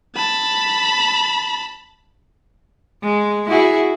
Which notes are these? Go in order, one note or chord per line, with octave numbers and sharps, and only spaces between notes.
A5 B5
G#3
E4 F#4 G#4